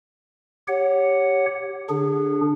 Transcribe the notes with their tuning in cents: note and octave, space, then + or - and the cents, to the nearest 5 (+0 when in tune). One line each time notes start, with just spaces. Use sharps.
G4 +0 C#5 +0 F#5 +0
D3 -5 D4 +0 G#4 -30